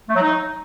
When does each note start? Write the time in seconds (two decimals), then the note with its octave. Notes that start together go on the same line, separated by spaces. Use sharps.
0.09 A3
0.15 F#3
0.21 D#4